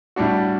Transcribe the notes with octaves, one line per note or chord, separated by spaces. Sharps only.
A2 G3 D4 F#4